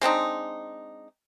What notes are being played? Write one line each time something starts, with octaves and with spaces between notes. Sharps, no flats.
G#3 C4 D4 D#4